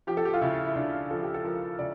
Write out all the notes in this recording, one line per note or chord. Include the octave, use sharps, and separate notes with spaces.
F3 G4
A4
G4
F4
C#3 E4
E4
C#3 D4
F3 A4
G4
A4
F3 A#4
C#3 D5